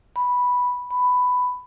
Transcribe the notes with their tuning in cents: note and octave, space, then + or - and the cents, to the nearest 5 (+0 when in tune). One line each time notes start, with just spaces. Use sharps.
B5 -5
B5 +10